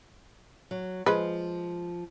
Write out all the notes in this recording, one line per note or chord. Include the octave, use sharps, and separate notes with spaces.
F#3
F3 G#3 B4